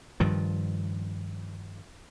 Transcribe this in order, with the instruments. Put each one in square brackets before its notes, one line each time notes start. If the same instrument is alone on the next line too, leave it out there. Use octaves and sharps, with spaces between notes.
[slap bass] G2 D#3 F3